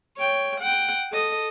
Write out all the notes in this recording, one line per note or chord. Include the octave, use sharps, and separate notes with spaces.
C#5 G5
F#5 G5
A4 D#5